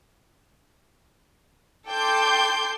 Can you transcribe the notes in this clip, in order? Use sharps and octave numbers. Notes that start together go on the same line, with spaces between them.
A4 G5 C6 D6 G6